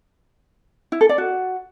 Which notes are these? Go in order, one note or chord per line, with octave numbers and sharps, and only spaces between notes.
E4
A4
D5
F#4